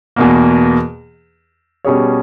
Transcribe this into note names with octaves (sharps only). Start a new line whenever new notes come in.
E2 B2 A#3
B2 G3 C#4 G#4 C#5